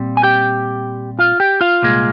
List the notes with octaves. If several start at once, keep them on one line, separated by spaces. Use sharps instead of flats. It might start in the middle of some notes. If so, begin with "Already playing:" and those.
Already playing: A#2 G3 C4
G#5
G4 G5
F4 F5
G4 G5
F4 F5
C2 A#2 G#3